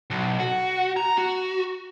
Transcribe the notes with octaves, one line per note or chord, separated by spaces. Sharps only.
B1
F#4
A#5
F#4